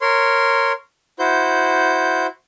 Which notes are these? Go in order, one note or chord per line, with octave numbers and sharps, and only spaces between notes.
A#4 C#5 C6
E4 F#4 C5 G6